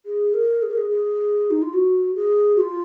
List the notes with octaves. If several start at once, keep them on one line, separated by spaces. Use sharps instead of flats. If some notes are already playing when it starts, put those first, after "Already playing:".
G#4
A#4
G#4
A#4
G#4
G#4
D#4
F4
F#4
G#4
F#4
F4